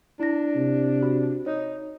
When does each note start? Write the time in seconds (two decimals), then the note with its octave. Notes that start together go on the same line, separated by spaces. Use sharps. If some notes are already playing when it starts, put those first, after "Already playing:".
0.19 D4 E4 A#6
0.56 C3
1.02 F#4
1.46 D#4 C#5